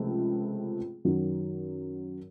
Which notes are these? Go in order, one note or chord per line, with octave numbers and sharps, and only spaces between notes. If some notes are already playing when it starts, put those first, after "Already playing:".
Already playing: C#2 C3 F3 A3 C4
F#2 D#3 F#3